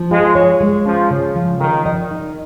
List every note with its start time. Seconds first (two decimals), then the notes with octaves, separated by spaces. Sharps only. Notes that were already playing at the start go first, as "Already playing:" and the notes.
Already playing: F3
0.11 G#3 F4
0.35 C#5
0.61 G#3
0.85 F3 C#4
1.11 C#3
1.36 F3
1.60 D#3 A#4
1.86 D#5
2.11 D#4